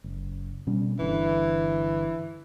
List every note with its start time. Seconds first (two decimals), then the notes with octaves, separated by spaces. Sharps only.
0.04 F#1
0.67 B2 G3 C#4
0.99 G1 D3 E3